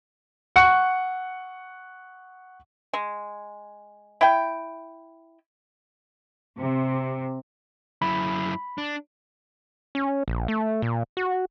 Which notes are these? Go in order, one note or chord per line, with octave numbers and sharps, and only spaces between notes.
F#5 C#6 F#6 C#7
G#3
E4 G5
C3
F#2 E4 B5
D4
C#4
A#1
A3
A#2
F#4